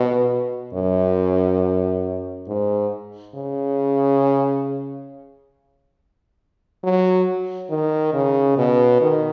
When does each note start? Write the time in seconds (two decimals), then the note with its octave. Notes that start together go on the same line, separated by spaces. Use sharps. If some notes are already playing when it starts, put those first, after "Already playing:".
Already playing: B2
0.74 F#2
2.48 G#2
3.35 C#3
6.84 F#3
7.70 D#3
8.14 C#3
8.57 B2
9.01 D#3